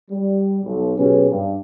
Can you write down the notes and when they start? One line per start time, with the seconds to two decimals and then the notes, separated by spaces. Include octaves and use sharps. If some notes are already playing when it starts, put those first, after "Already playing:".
0.11 G3
0.65 B1
0.97 B2 F#3 C#4 G4 G#4 B4
1.30 G2